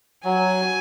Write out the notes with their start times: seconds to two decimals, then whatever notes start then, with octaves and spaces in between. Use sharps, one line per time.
0.24 F#3 G#5